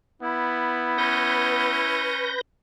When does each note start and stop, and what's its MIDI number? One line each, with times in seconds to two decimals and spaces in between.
0.22 1.84 59
0.22 2.08 64
0.98 2.33 61
0.98 2.41 71
0.98 2.41 91
0.98 2.41 94